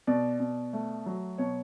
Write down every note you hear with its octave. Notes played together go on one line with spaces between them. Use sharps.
B2 D5
B2
A3
F#3
B2 C#5